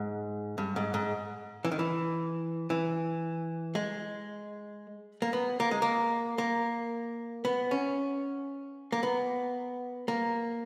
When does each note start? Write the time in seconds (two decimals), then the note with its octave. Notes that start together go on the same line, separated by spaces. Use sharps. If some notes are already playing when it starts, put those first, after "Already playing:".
Already playing: G#2
0.58 G2
0.76 G#2
0.94 G#2
1.65 E3
1.72 D#3
1.79 E3
2.70 E3
3.75 G#3
5.22 A#3
5.33 B3
5.60 A#3
5.71 G#3
5.82 A#3
6.38 A#3
7.45 B3
7.71 C#4
8.92 A#3
9.03 B3
10.08 A#3